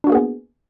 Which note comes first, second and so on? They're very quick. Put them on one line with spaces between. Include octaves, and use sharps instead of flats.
D4 F#4 A#3 G#4 B3